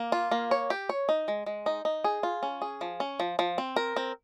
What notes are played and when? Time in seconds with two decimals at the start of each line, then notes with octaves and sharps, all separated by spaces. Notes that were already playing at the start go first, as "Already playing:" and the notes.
Already playing: A#3
0.12 F4
0.31 A#3
0.51 C#5
0.70 G4
0.89 C#5
1.09 D#4
1.28 G#3
1.46 G#3
1.66 D#4
1.85 D#4
2.04 G#4
2.23 F4
2.43 C#4
2.62 G#4
2.81 F3
3.00 C#4
3.20 F3
3.39 F3
3.58 C4
3.76 A#4
3.96 C4